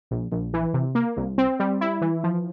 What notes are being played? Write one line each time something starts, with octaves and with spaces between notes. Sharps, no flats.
A#1
A#1
E3
C3
A#3
C2
C4
G3
E4
E3
F3